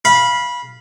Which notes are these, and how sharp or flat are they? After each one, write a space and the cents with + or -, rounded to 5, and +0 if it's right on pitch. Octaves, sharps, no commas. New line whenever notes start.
F5 +0 B5 -20